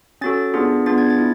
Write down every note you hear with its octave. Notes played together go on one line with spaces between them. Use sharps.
C#4 F#4 A4 A6
B3 D4 F4 G#4
B3 D4 F4 G#4 A6
G#6
A6
E4